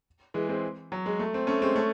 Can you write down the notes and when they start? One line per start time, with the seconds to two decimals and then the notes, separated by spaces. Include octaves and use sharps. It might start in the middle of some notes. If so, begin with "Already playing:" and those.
0.34 E3 G#3
0.48 G#3 C4
0.92 F#3
1.06 G#3
1.19 A3
1.34 C4
1.47 A3 C#4
1.62 G#3 C4
1.75 A3 C#4